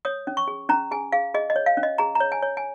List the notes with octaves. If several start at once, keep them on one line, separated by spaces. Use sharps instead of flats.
C#5 D#6
C#4
C#6
G#4
C#4 A#5
G#4 G#5
G#4 F5
G#4 D#5
D#5
C#5
F5
C#4
D#5
G#4 A#5
A#5
C#5
G#5
C#5
G#5